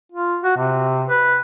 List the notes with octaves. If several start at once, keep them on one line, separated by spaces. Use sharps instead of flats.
F4
F#4
C3
B4